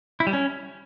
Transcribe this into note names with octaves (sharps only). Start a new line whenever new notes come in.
E4
G3
C#4